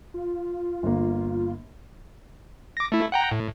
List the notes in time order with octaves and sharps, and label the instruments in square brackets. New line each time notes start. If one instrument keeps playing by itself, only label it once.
[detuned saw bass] F4
[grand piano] G1 A#3
[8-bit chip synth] D6 A#6
A3 E4
F#5 G5 A#5
A2